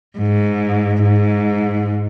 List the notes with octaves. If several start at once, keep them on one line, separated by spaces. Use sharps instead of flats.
G#2
G#2